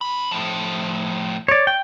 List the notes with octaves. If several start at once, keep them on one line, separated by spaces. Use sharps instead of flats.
C3 B5
A2 F3
C#5 D5
G5